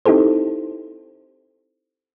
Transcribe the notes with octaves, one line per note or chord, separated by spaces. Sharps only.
C4 D#4 E4 G4 A4 C5